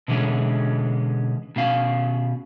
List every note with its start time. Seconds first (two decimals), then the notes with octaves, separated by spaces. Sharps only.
0.08 B2 D3 E3 G3 G#3 C#4
1.56 B2 C#4 F5